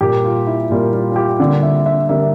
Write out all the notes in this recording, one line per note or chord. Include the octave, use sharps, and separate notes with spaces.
A#2 G3 A#3 G4
F4
E4
A#2 G3 A#3 F4
F4
F4
G4
D3 G3 A#3 D5
E5
E5
D3 G3 A#3 E5